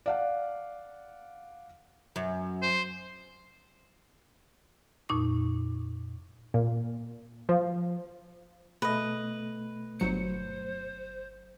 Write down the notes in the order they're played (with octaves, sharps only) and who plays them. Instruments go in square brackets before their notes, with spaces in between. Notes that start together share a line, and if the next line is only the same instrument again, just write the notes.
[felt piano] D5 F5 F#5
[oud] F#2
[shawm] C5
[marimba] F2 A#2 D#4 C#6
[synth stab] A#2
F3
[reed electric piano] B2 A3 [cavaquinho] B4 D#5
[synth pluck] G1 F#3 C#7 [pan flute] C5